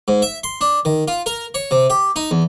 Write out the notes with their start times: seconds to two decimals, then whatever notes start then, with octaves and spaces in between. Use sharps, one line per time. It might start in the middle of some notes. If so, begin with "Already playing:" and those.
0.08 G#2
0.22 E5
0.44 C6
0.61 D4
0.85 D#3
1.08 F4
1.26 A#4
1.54 C#5
1.71 C3
1.90 G4
2.16 D#4
2.31 E2